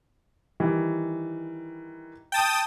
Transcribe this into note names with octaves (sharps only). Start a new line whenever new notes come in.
D#3 E3 G3
G5 A5 D#6